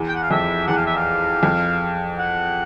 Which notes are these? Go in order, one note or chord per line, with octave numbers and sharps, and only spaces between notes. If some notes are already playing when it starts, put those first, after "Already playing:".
Already playing: E2
G5
F#5
F5
F2 E5
E2 F#5
F5
E5
F5
F2
F#5